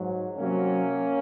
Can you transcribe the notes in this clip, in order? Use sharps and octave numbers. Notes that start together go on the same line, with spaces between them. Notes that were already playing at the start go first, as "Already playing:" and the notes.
Already playing: G#2 F#3
C3 F#3 A#3 C#4